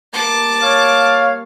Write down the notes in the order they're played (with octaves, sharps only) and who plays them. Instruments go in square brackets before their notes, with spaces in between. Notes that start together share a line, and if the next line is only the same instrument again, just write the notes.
[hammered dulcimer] G3 A#3 [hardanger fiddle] A5 D6
[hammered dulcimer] A#2 [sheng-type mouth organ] C#5 [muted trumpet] F5